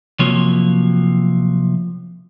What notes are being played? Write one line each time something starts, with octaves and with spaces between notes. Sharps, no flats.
C3 F3 F#3 A#3 C#5